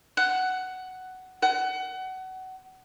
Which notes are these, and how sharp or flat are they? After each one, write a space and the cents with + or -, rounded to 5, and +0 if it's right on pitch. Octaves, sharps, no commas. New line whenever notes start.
F#5 +10
F#5 +25